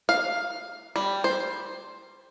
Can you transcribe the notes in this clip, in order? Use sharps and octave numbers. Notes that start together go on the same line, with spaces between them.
F5
G3
C5